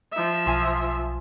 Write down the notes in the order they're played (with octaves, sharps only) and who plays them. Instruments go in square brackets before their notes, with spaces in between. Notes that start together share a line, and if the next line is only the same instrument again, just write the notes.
[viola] F3 E5
[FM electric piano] B1 [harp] F4 G#5